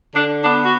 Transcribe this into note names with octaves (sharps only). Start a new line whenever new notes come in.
D3 D4
B3 D4
F#4